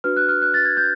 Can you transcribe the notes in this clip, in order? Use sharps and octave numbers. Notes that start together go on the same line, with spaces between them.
D4 F#4 B4 F6
F#6
F6
F#6
A6
G#6
G6